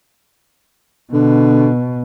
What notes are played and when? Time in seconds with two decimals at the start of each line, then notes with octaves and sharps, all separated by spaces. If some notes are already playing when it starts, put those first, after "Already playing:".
1.13 B2 D3